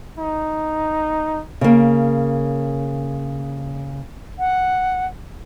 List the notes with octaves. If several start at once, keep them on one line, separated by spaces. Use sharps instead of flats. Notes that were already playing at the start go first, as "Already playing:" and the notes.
D#4
C#3 A#3
F#5